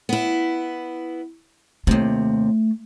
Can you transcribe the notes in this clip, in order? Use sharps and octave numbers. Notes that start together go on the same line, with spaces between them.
B3 E4
D#2 C3 A3